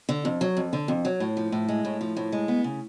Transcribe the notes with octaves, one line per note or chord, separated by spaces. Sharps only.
D3
F2
F#3
F2
D3
F2
F#3
A2
F3
A2
G#3
A2
F3
A2
G#3
B3
C#3